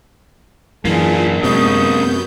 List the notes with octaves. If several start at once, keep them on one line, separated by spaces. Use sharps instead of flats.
F#2 E3 A#3 D4 F4 G#4
F#2 C3 G#3 B3 C#6 D#6 G6